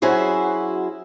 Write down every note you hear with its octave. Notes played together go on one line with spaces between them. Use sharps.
F#3 C#4 E4 F#4 G#4 C5